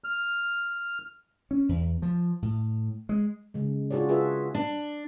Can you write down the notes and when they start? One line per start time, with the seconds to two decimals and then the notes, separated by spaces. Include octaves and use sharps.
0.04 F6
1.51 C#4
1.69 E2
2.02 F3
2.42 A2
3.09 G#3
3.54 C#3 G#3
3.91 D4 F4 F#4 G#4 C#5 D5
4.09 F4 F#4 G#4 B4 E5
4.55 D4